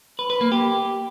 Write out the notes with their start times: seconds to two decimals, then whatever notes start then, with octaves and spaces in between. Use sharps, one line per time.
0.19 B4
0.30 B4
0.41 A#3
0.52 G4